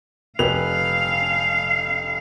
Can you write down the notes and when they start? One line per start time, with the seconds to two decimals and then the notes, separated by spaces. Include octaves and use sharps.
0.39 F1 B4 F5 F7